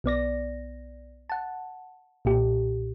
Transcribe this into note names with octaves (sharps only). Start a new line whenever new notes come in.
B1 B3 D5 A#6
F#5 A5
B1 A#2 G4